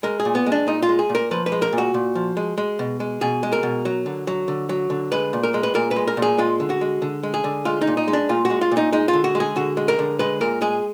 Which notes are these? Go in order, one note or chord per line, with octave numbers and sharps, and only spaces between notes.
G#3 A#4
G#4
A#2
B3
G#3
D4
A#2 D#4
F4
G#3
G#4
A#2
A#4
F3 B4
B4
G#3
A#4
A#2
F#4
A#2
F3
G#3
G#3
B2
G#3
B2 G#4
G#3
A#4
B2
F#3
D3
F#3
D3
F#3
D3
G#3 B4
A#2
A#4
G#3
B4
A#2 A#4
B4
G#3
A#4
A#2
G#4
G#3 F4
D3
F#4
G#3
D3
G#3
G#4
D3
G#3 F4
D#4
A#2
D#4
G#3
D4
A#2 F4
F#4
G#3
F4
A#2
D#4
G#3 D#4
F4
D3
F#4
G#3
G#4
D3 F#4
G#3
A#4
D3
G#3 B4
A#2 A#4
G#3 G#4